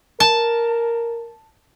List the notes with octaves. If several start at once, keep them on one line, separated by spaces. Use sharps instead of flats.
A#4 A5